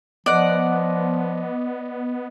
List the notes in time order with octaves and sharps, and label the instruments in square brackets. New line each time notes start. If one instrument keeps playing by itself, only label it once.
[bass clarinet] F3 [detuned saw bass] B3 [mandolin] D5 F#5 [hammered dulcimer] D#5